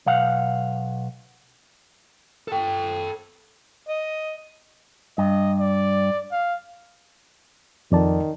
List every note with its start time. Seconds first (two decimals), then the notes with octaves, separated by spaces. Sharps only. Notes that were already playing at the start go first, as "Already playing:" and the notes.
0.06 B1 B2 F5 F#5
2.48 A4 G5
3.89 D#5
5.18 G2 D#5
5.60 D5
6.32 F5
7.92 F2 D#3 D5 A5